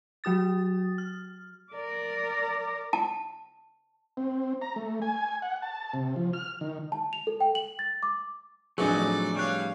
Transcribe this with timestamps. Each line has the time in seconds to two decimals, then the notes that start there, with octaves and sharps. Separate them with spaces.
0.24 F#3 F#4 D#6 A6
0.98 F6
1.72 A#4 D5
2.93 A5
4.17 C4
4.62 A#5
4.76 A3
5.02 G#5
5.42 F#5
5.62 A5
5.94 C3
6.16 F3
6.33 F6
6.61 D#3
6.92 A5
7.13 F7
7.27 A4
7.40 G5
7.55 F#7
7.79 A6
8.03 D6
8.78 F2 A2 E3 F#3 D4 D#4 G#4 D5
9.36 G3 C#5 F5 F#6